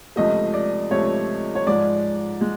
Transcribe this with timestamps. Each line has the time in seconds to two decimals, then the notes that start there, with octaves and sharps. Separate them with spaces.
0.16 C#2 C3 F3 A3 D#5
0.54 D5
0.91 C#2 C3 F3 A3 C#5
1.55 C#5
1.67 G#2 F3 G#3 D5
2.41 G#3